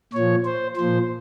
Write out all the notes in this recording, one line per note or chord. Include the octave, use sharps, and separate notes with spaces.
A#2 F3 C#5
C5
A#2 F3 C5